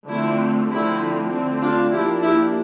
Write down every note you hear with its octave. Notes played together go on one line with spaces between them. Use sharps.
D3 F3 A3 C4 E4
D3 F3 A3 C4 E4
D3 A3 C4
D4 F4
F3 A#3 D4 E4 G4
E4 G4